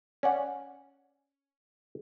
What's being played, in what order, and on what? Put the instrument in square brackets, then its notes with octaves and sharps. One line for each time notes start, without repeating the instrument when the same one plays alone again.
[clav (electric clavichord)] C#4 D5 F#5